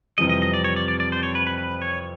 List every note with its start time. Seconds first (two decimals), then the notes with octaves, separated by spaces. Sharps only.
0.18 F2 C3 E3 G3 D#5
0.29 D#5
0.42 D#5
0.53 D5
0.64 C#5
0.76 D5
0.88 D5
1.00 D5
1.12 C5
1.23 C#5
1.35 B4
1.47 B4
1.58 B4
1.82 C#5